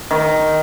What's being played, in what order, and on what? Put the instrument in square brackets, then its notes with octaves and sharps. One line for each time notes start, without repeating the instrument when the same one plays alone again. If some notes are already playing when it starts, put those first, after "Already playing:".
[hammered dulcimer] D#3